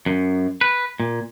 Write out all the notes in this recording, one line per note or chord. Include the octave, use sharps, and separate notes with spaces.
F#2
B4
A#2